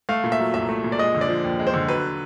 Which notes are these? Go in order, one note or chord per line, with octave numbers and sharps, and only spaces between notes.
A3 F5
A#2
E5
F#3
C2 E5
A3
A#2
D5
G#3 D#5
D3
D5
F3
D#2
G#3
C5
D3
F#3 B4